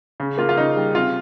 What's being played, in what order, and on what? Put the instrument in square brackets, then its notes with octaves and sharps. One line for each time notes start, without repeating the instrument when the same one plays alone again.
[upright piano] C#3
A#3 F4
F4
C#3 D#4
G3
C3 F4